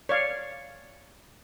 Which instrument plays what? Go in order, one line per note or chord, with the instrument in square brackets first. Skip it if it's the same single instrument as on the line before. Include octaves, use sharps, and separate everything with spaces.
[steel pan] C#5 D5 F5